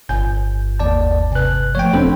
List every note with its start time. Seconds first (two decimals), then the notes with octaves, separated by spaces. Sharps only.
0.09 G1 G#5 G6
0.79 D#2 D5 A5
1.32 C3 B4 G#5 F#6
1.75 F3 A3 C#5 G5
1.93 D#1 C4 D4 A4 C5